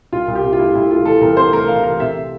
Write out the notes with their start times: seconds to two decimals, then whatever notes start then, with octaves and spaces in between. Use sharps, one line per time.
0.12 C2 F4
0.28 C2
0.35 G4
0.44 C3
0.53 F4
0.59 A3 E4
0.74 C2 E4
0.91 A3 F4
1.05 E3 A4
1.21 C2 A#4
1.37 C3 C5
1.53 A3 A#4
1.68 E3 F5
1.84 A3 A#4
2.00 C3 E5